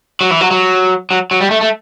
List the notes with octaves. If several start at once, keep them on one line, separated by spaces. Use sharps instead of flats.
F#3
E3
F#3
F#3
F#3
F#3
G3
A3
A3